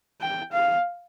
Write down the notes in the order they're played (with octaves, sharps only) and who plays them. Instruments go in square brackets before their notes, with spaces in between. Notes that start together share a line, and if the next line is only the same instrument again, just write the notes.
[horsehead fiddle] G5
F5